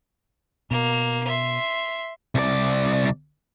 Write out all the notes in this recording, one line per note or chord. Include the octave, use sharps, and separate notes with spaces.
B2 A#3
E5 C6
C2 D5